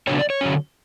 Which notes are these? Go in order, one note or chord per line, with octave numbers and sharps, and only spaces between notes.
C#3 F#3 B3 D4 C#5
D5
C#5
D3 F#3 C#4